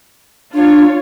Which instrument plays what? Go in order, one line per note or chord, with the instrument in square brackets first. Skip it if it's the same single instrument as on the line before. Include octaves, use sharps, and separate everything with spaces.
[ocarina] D4 [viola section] F4 C#5